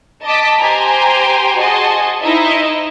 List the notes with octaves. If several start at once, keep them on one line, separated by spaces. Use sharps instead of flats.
D#5 A5 D6 B6
G4 C5 G5 G#5 A#5
F#4 G#4 D#5 G#5 A5 C6
D#4 E4 C5 D#5 E5